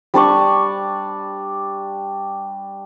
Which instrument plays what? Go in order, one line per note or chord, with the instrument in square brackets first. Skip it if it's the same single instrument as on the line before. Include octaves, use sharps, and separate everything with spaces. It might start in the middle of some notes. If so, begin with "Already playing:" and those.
[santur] G3 D4 D5 C#6